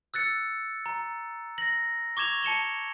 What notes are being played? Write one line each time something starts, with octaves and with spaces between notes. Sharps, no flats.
E6 F#6 A6 C#7
A#5
A#6 F#7
C#6 D6 G#6 E7 F7
A5 C#7 E7 G7